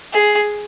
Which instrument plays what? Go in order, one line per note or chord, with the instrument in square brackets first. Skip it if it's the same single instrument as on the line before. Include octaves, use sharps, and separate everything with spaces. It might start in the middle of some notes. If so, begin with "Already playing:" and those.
[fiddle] G#4